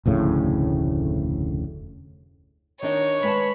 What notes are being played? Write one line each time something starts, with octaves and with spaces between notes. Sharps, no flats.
F1 D2 A2 C#3
D#3 D4 D#4 C#5 D#5
G#3 B4 G#5 A5 B5